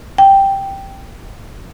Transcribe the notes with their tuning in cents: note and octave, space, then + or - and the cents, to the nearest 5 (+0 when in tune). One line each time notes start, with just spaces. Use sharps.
G5 +0